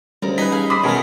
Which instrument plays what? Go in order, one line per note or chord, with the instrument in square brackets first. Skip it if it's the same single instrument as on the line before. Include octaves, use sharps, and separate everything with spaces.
[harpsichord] D2 [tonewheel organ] G3 C#4 [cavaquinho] A#4
[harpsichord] D#4 [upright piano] B4 B6 [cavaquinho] G#5
[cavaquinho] G#4 F5
[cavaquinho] C5 B5 [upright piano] D6 D#6 B6
[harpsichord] B2 A3 [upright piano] C#4 G#4 A#4